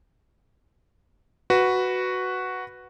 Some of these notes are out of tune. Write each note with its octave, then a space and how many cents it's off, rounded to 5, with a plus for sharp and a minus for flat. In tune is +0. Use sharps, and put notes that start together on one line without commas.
F#4 +0 B4 +0